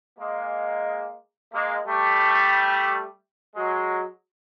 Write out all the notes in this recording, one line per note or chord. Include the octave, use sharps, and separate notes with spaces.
G#3 A#3
G#3 A#3
G3 A3
F#3 G#3